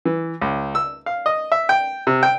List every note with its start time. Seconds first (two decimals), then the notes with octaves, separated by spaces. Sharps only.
0.05 E3
0.41 C#2
0.75 E6
1.06 F5
1.26 D#5
1.52 E5
1.69 G5
2.07 C3
2.23 G5